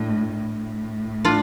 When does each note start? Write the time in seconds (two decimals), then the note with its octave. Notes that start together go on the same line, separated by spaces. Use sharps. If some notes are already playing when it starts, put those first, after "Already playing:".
Already playing: A2 D4
0.37 A2
1.25 D4 F4